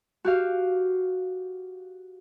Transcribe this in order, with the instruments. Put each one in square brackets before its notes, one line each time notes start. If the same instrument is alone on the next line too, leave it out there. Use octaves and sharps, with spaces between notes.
[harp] F#4 G4 F5